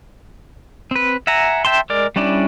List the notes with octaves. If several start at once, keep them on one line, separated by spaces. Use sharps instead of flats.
C4 B4
E5 F#5 G#5 A#5
E5 G5 A5 C6
G#3 A#4 D5
G3 C#4 D4 E4 D5